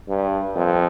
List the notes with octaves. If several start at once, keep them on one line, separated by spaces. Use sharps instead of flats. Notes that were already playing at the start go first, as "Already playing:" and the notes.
G2
F2